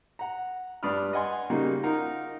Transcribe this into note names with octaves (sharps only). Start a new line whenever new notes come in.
F#5 A#5
G2 D5 B5 D#6 F6
D#5 F#5 G#5 C6
C#3 G3 A#3 D#4 F#4
D#4 F4 A#4 F#5 A#5